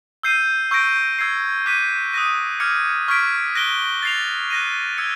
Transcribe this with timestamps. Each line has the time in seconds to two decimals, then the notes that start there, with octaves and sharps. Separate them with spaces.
0.23 E6 G6 C7 D#7
0.71 C#6 E6 G6 A#6 D7
1.19 E6 G#6 C7
1.66 D6 F#6 B6 D#7
2.13 D#6 F#6 A#6 D#7
2.60 D6 F6 G#6 C#7
3.08 C#6 F6 G#6 B6 D7
3.55 F#6 A#6 D7 G7
4.02 A6 C7 F7
4.50 F#6 A#6 D#7
4.98 E6 G#6 C#7